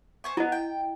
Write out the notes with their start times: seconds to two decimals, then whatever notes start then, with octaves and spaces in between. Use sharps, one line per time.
0.24 C5 G#5 C#6
0.37 B3 E4 D#5
0.52 G5